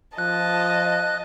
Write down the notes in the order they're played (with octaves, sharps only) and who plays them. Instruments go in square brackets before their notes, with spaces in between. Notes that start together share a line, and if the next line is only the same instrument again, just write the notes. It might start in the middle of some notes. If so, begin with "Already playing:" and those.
[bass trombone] F3 [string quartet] D#5 A5 [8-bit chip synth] F#6